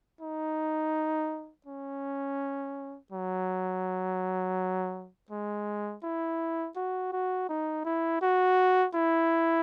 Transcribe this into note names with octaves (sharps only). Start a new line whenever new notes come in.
D#4
C#4
F#3
G#3
E4
F#4
F#4
D#4
E4
F#4
E4